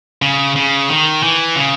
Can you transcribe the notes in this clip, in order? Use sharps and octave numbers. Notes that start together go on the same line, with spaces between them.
C#3
C#3
D#3
E3
C#3